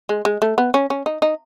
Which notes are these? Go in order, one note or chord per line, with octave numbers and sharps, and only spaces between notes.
G#3
G#3
A3
B3
C#4
C#4
D#4
D#4